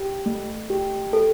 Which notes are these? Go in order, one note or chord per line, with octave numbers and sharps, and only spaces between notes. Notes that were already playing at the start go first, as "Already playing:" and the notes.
Already playing: G4
A3
G4
A4